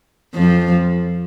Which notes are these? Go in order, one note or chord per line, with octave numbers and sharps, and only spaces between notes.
F2 F3